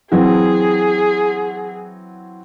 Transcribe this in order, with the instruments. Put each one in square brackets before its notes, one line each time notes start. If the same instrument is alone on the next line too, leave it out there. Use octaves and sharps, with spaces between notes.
[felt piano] E3 F#3 C4 [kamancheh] G#4